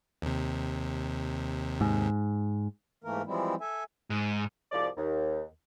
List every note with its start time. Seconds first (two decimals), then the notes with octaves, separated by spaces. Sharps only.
0.22 D#2 C3
1.81 G#2
3.04 G#2 E3 A3 A#3 A#4
3.26 E3 F3 G3 G#3 C4 E4
3.61 A4 E5 G#5
4.10 G#2
4.72 C2 G#2 F3 D5
4.96 D#2